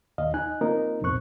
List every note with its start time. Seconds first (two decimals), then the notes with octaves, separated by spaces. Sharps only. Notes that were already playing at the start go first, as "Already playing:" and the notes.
0.18 D#2 D#5 F5
0.34 D#4 G#5 F#6
0.61 A#3 C4 D#4 F4 A#4
1.01 C2 F2 A#2 C4 C#6 F#6